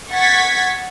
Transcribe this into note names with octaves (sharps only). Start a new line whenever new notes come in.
F#5 C#6 G#6 A6 B6